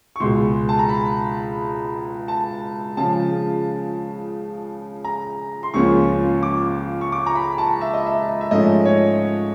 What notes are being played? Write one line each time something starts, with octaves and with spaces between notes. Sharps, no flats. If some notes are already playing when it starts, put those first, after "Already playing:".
C#6
C#2 B2 G#3 C6
A5
A#5
B5
A5
C#3 F3 G#3 A5
A#5
C6
C#2 C#3 F3 A#3 C#4 C#6
D6
C#6
D6
A#5
B5
A5
E5
D#5
E5
E5
G#2 F3 A3 C#4 D#5
C#5